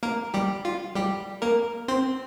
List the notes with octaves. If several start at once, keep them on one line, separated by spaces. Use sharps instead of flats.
A#3 A#4
G3 G4
F4
G3 G4
A#3 A#4
C4 C5